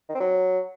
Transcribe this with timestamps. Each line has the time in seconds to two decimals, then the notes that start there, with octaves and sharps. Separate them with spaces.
0.09 D#3
0.15 C4
0.21 F#3